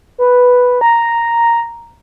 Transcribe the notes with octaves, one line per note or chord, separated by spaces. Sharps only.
B4
A#5